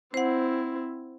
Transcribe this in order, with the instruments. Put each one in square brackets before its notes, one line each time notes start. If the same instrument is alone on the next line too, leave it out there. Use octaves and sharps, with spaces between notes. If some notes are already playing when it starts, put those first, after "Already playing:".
[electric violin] C4 E4 [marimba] C5 F#5